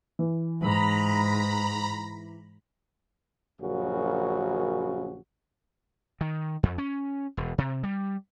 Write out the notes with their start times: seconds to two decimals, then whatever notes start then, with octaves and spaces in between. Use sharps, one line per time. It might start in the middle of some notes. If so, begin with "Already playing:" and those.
0.19 E3
0.60 G#2 A#5 B5
3.61 A#1 F#2 C#3 F#4
6.21 D#3
6.63 F2
6.78 C#4
7.37 E1
7.58 C3
7.83 G3